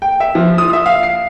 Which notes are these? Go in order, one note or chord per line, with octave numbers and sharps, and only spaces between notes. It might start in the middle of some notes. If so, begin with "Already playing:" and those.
G5
E5
F3
D#6
E5
F5
C7